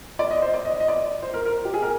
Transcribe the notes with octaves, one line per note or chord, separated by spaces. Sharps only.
D5
D#5
C5
D5
D#5
D#5
D5
C5
A#4
A#4
G4
G#4
A#4